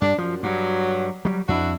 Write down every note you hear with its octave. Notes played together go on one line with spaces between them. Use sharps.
G2 D4
F#2 F3
G2 F#3
F#3 G3
F2 D4 E4 F#4